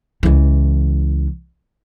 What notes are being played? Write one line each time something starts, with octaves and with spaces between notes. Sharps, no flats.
C#2 E3